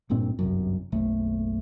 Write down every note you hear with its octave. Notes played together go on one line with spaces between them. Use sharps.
D1 G2 A#2 C4
G1 C2 F#2
F#1 B1 A3